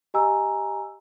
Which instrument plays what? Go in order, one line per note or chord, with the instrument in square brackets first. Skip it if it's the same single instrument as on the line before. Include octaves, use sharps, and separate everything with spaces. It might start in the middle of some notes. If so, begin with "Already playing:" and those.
[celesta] G4 D#5 G#5 A#5 E6